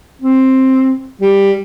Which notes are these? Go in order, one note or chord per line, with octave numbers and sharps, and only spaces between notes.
C4
G3